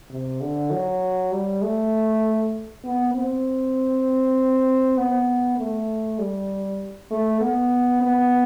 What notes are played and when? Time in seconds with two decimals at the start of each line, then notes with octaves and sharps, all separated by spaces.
0.10 C3
0.41 D3
0.71 F#3
1.32 G3
1.62 A3
2.84 B3
3.15 C4
4.97 B3
5.58 A3
6.19 G3
7.11 A3
7.41 B3
8.02 B3